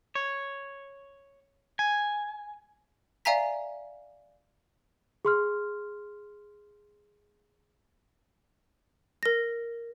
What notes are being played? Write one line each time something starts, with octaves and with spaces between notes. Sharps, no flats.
C#5
G#5
D5 E5 F5 G#5 A#5 B6
G#4 C6 F6
A#4 A#6